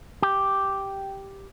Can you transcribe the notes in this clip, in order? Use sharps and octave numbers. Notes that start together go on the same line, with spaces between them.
G4